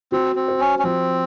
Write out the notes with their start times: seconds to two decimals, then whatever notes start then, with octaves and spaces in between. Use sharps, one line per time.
0.12 C4 F#4
0.36 C4
0.48 C5
0.60 C#4
0.79 C#4
0.84 F3 C4